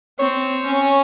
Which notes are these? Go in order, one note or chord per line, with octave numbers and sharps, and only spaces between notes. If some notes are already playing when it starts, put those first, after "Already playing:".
C4 C#5
C#4